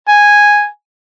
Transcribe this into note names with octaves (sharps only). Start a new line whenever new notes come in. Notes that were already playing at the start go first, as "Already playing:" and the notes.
G#5